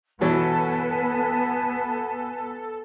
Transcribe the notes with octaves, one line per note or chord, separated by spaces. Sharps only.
B2 E3 F#3 B3 A4 B4 G#5 A5